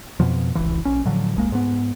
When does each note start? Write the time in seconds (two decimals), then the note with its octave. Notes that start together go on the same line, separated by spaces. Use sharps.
0.20 F2 B2 F3
0.55 D1 G#1 C#2 E3
0.85 A#1 C#4
1.05 A2 D3 F3 F#3
1.35 D#1 C2 G#3 A#3
1.52 G#2 B3